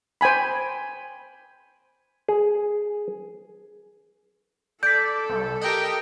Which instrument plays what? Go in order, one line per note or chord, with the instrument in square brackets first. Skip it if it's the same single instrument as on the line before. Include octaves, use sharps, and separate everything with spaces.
[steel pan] C5 G5 G#5 B5
[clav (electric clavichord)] G#4
[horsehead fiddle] A4 [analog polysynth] D5 [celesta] G6 B6
[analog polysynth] C2
[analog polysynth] G4 D#5 [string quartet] A#4 G5